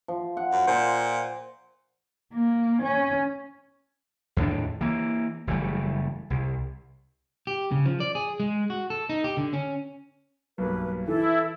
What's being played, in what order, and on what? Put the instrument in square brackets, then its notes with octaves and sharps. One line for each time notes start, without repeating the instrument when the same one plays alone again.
[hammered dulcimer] F3
F#5
[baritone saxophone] F#2
[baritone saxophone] A#2 [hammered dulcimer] C5
[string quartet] A#3
C#4
[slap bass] E2 A2 D#3 D4
E3 A#3
F#1 E3 G3 A3
C2
[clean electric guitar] G4
C#3
F3
D5
G#4
G#3
F#4
A4
D#4
G4
D3
C#4
[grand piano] B1 G2 A#3 [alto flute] B4
[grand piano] E3 [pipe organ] E4 [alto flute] A4